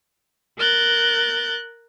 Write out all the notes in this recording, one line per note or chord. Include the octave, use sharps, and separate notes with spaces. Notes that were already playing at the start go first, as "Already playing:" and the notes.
A#4 F#6 G6 A6